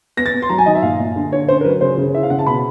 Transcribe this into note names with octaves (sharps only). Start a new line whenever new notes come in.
B3 A#6
A6
B3
C6
F#3 A#5
G#5
D#3 D#5
E5
A#2 F5
A#2
D3
D3 C#5
C#4 C5
A#4
F#3 B4
C#3 C5
C#3
E4 E5
F5
C#3 F#5
A5
B2 B5